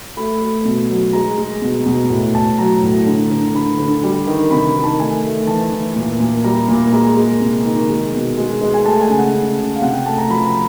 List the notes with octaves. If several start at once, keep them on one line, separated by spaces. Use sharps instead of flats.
A3 B5
A3
B2
F#3
G#3 A#5
G#3
B2
B2
A2
A2 A5
F#3 A#5
A2
D3
D3
D3 B5
D3
G3
D#3
C3 B5
D#3
A5
A3 G#5
A3
E3 A5
E3
A#2
A#2
G3 A#5
A#2
G#3 A#5
G#3
C3
D#3
G#3
B2
G#3
G#3
G#5
A3 A5
G#5
C#3
F#5
C#3
C#3
F5
C3 F#5
G5
A3 A5
A#5
F3 B5
A#5